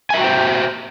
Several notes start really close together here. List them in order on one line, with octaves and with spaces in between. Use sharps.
G#5 E5 F#4 G5 C5